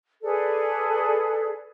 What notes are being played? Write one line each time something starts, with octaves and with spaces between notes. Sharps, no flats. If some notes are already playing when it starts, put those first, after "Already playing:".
G#4 A4 B4 D5